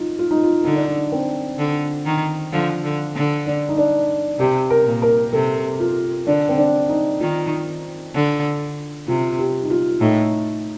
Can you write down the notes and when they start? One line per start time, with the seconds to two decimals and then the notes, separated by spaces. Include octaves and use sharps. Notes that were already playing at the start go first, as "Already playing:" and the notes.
Already playing: D#4 F4
0.19 F4
0.31 D#4
0.43 F4
0.65 D3 D#4
0.76 D4
0.86 D#4
1.12 C4
1.59 D3
2.06 D#3
2.52 D3 F3
2.84 D3
3.15 D3
3.46 D4
3.69 D#4
3.77 D4
4.39 C3 G4
4.70 A#4
4.86 A#2
5.02 A#4
5.33 C3 A4
5.80 F4
6.27 D3 D4
6.49 C4
6.58 D4
6.89 D#4
7.20 D#3 F4
8.15 D3
9.08 C3 F4
9.39 G4
9.63 D#4
9.70 F4
10.01 A2 D#4